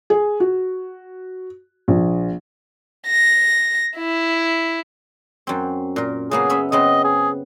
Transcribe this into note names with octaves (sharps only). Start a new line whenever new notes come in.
G#4
F#4
A#1
A#6
E4
F#2 C4
A#2 A#4
C#3 A#3 B3 G#4
C#4 E5 B5
C#3 B3 C4 D#5
G#4